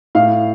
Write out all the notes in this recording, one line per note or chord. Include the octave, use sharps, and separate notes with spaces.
A2 F5